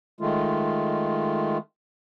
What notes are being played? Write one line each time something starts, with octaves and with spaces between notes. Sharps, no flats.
D#3 G#3 A3 F4